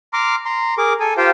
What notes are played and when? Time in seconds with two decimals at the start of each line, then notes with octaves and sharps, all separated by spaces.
0.13 A#5 C6 D6 F6
0.45 A#5 C6
0.78 G#4 A#4 D6
1.00 A4 G#5
1.17 F4 G4 C5 F5 G5